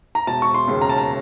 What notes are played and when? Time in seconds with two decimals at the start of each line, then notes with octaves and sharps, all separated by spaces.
0.15 A#5
0.27 E1 A5
0.42 C#6
0.54 C6
0.68 D#2 C#3
0.82 A#5
0.89 A5
0.98 A#5